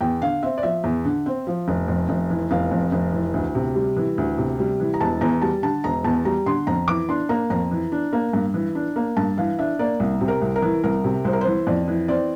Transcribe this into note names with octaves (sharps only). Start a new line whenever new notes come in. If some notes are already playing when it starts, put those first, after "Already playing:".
E2 G5
D3 F5
C4 E5
D5
F3 E5
E2
D3
C4
F3
F1
F2
F1
E3
F1 F5
F2
F1
E3
D2
C3
G3
E3
D2
C3
G3
E3
A#5
E1 A5
E2 A#5
G3 A5
D3 A5
E1 A#5
E2 A5
G3 A#5
D3 C6
F2 A#5
E3 D6
D4 C6
A#3 A#5
F2 A#5
E3
D4
A#3
G2
E3
D4
A#3
G2 A5
E3 F5
D4 E5
A#3 D5
C2
C3
A#4
C2
A#4
E3
C2 A#4
C3
C2 C5
A#4
E3 C5
F2 D5
E3
C4 D5